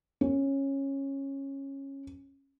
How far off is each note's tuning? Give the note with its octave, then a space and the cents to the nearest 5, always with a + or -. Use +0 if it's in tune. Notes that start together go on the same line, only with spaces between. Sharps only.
C#4 -15